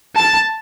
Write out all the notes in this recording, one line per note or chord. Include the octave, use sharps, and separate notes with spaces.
A5